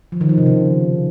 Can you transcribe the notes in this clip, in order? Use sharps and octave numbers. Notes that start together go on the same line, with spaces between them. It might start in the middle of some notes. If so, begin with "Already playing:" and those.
F3
D#3
F3
C3
C#3